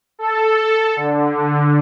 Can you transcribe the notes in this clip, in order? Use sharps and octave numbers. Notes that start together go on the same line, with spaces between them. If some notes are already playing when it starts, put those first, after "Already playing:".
A4
D3